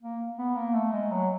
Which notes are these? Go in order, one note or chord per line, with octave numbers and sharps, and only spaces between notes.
A#3
B3
A#3
A3
G#3
F#3